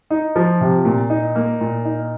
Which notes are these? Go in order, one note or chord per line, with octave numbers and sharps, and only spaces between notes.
D#4
F3
C3
A#2
D#4
A#3
A#2
D#4